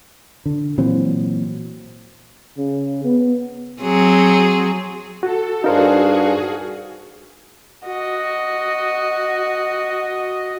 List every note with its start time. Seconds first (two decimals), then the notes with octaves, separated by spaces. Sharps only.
0.46 D3
0.78 A#2 E3 F#3 C4
2.58 C#3
3.04 B3
3.82 F#3 C4 G#4
5.23 F#4 A4
5.64 G2 D4 D#4 F#4 G#4 A#4 C5 F5
7.87 F#4 D#5